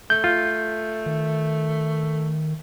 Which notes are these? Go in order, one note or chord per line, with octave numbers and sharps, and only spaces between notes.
A3 G6
F4
D#3